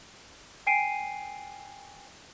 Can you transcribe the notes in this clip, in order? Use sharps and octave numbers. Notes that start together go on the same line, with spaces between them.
G5 G#5 C7 D7 D#7